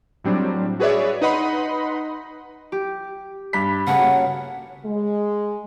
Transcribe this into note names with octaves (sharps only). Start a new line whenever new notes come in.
A2 F#3 G3 C4 D4
F#4 G#4 B4 C#5 D5 E5
D#4 B4 D#5 F#5 B5 C6
G4
G2 B5 B6
C#3 A3 C#4 B4 F#5
A#3 F#4
G#3